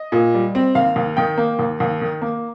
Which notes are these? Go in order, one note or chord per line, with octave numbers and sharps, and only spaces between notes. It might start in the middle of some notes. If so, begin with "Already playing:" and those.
Already playing: D#5
A#2
G3
C4
D#2 F5
D#2
D#3 G5
A#3
D#2
D#2
D#3
A#3